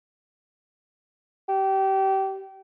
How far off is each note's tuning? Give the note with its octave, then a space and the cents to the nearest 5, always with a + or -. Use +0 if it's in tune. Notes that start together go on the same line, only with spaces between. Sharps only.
G4 -25